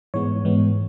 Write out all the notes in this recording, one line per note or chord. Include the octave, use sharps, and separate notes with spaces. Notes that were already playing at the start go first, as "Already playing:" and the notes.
G#2 E3 G#3 B3 C#5
G#2 E3 G#3 B3